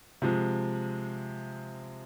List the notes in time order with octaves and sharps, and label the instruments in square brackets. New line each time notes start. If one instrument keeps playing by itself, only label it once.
[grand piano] C3 F3 G#3